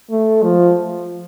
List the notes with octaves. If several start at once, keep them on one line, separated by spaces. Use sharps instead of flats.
A3
F3